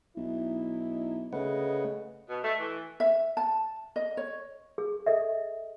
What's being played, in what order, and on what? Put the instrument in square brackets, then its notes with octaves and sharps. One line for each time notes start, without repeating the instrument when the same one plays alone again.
[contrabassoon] B1 [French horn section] D#4 E4
[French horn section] D2 D#5 [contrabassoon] C#3 [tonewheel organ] A3 B4 F#5
[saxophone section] B2
A3
E3
[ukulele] E5
A5
D#5
C#5
[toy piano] G#4
A4 D#5 E5